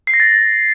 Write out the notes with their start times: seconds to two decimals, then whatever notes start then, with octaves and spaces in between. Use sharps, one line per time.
0.07 C7
0.14 A#6
0.20 A6